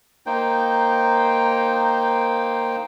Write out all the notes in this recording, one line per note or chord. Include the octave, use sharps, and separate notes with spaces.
A#3 D#4 C5 G5